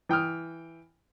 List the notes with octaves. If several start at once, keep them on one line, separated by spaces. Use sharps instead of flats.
E3 G5 D#6 F6